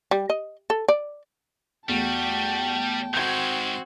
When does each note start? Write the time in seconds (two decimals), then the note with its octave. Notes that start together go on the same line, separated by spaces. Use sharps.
0.11 G3
0.30 D#5
0.70 A4
0.89 D5
1.89 E2 G3 A3 F#4 G5 A5
3.14 G#2 D#3 C4 F#4 G6 G#6